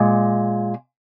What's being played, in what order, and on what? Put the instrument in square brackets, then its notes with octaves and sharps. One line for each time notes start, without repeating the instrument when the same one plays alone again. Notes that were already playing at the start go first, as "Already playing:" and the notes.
Already playing: [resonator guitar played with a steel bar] A#2 G#3